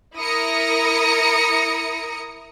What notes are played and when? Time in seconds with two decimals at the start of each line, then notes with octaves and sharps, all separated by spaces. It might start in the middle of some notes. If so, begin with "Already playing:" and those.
0.17 E4 A#4 D#6 A#6 C#7